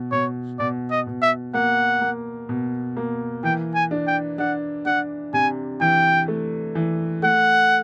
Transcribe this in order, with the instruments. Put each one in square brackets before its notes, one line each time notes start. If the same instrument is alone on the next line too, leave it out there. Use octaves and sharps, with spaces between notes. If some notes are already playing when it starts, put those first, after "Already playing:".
Already playing: [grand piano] B2
[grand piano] B2 [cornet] C#5
[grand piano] B2 [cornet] D5
[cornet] D#5
[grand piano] B2
[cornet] E5
[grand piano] A#3 [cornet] F#5
[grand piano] A#3
B2
A#3
[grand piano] E3 [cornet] G5
[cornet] G#5
[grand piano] D4
[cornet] G5
[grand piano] D4 [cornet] F#5
[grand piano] D4 [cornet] F#5
[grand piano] C3 [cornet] G#5
[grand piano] E3 [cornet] G5
[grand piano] A3
E3
[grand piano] A3 [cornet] F#5